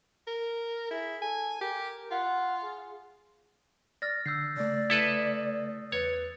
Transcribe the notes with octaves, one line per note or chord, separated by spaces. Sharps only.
A#4
E4 G#4
A4 G#5
G4 A#4
F4 F#5
G#4
D5 F6 A6 A#6
D3 E6 G6 C7
C#3 A3 D5
E4 A4 B4 D#6
E2 B4 C#5 A6